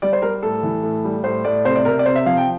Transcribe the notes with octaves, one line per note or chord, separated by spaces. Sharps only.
G3 D5
C5
G3 A#4
A2 A4
E3
A2
G3
A2 C5
A2 D5
C3 C5
D5
C3 A#4
D5
C3 C5
E5
F3 F5
G5